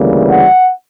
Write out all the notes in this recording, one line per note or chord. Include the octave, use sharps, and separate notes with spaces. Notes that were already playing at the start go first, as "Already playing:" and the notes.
Already playing: D2 C#3 E3 G3 A#3
F#5